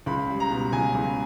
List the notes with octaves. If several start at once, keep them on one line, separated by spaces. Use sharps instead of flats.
C#2 B5
G3
A#5
B2
C#2 G#5
C#2